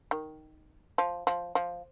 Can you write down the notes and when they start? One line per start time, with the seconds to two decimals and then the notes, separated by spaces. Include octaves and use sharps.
0.11 D#3
0.98 F3
1.27 F3
1.55 F3